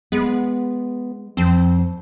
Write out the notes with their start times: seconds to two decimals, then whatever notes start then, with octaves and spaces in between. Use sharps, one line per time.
0.12 G#3 B3
1.37 F2 C4